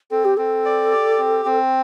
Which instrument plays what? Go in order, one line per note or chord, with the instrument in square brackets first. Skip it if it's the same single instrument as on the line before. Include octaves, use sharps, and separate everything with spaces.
[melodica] C4 [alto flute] A4
[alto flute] G4
[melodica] C4 [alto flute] A4
[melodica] D5
G4
C4
C4